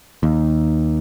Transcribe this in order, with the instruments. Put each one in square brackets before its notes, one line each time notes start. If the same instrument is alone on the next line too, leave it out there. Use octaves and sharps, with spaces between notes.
[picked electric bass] D#2